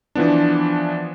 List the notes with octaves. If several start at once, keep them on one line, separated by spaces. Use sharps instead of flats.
E3 F3 B3 D4